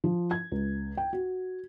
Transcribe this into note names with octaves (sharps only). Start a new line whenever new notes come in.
F3
G#6
C#2
G5
F#4